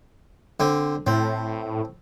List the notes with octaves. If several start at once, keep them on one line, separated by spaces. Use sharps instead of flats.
D3 C4
A2 C4